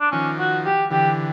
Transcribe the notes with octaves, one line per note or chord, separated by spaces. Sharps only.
D4
D#3 F3 C#4
F#4
G4
D3 E3 G4